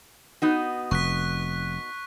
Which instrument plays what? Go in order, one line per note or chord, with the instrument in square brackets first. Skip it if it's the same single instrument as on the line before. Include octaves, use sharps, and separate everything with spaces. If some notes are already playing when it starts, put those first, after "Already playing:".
[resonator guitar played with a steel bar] B3 D#4 F#4
[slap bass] F1 [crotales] C#6 F#6 B6